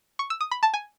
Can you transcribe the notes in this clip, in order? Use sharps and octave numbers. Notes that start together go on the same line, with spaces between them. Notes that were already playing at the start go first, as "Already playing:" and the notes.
C#6
E6
D#6
B5
A5
G#5